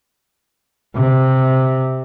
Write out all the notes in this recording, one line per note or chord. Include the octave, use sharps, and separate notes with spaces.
C3